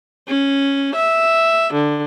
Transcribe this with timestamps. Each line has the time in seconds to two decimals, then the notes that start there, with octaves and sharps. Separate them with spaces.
0.28 C#4
0.96 E5
1.74 D3